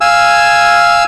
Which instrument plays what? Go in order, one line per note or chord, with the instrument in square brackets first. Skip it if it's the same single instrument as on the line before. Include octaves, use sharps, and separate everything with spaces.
[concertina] F5 G#5 E6